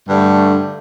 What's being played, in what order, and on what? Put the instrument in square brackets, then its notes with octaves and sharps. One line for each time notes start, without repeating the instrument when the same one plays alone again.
[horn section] G2 D3 A3